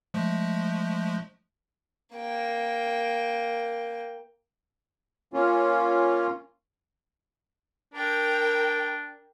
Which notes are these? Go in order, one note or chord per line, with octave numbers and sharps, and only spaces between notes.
F3 G#3 A3
A#3 G5
A#3 C#4 F4
D4 A#4 G5